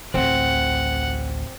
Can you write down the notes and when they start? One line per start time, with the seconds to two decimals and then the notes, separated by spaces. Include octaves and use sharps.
0.14 A1 D2 C4 F#5